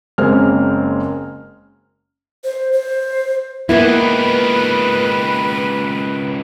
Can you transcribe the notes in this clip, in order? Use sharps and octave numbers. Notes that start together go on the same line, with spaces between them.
F#1 G#3 A#3 C4 C#4 F6
C5
C5
C#2 D#3 A#3 B3 E4 B4